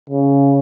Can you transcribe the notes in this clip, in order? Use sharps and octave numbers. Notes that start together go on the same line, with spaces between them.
C#3